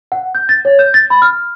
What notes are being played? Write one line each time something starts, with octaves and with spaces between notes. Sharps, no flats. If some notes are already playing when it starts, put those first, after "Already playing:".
F#5
G6
A6
C#5
G6
A6
B5
F6